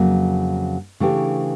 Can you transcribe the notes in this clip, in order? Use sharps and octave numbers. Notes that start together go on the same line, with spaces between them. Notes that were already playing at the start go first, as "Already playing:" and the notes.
Already playing: F2 C#3 F#3 A#3
C#3 E3 A3 D4 G4